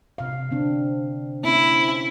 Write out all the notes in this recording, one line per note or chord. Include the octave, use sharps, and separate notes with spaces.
C3 F5
D3 C4 D4
A#3 C4 C#4 E4